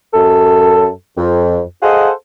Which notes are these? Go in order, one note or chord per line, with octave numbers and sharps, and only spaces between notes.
F#2 A4
F2
G#4 A4 C5 D#5 F5 F#5